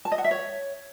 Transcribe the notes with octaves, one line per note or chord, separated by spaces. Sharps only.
A5
D#5
F#5
E5
C#5